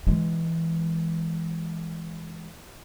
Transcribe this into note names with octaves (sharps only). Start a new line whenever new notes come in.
E3 G#3